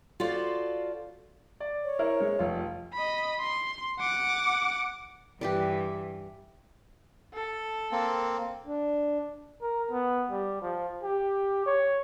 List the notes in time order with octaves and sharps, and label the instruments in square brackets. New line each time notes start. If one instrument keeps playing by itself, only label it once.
[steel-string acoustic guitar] F4 F#4 A4 C5 D5 F5
[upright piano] D5
[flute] C#5
[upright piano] E4 A#4 C5
G#3
F1 F4
[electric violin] D#5 B5
C6
F#5 D6
[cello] G2 E3 [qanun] G4 B4 D5
[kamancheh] A4
[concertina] A#3 C4
[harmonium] D4
[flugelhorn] A#4
B3
G3
F3
G4
C#5